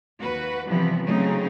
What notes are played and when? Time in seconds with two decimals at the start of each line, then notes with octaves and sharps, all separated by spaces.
0.20 D#2 F#4 B4
0.66 C3 E3 F3 G3 B3 C4
1.04 C#3 F#3 G#3 A3 C4 D#4